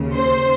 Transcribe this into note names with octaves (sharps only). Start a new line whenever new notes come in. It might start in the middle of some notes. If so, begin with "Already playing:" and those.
Already playing: D#2 C#3
C5